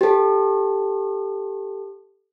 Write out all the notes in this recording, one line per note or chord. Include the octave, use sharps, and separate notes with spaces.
G4 A4